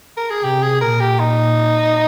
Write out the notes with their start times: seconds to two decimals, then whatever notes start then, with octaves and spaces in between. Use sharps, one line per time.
0.17 A#4
0.30 G#4
0.43 C3 G4
0.62 G#4
0.81 A#2 A#4
1.01 G4
1.19 D#4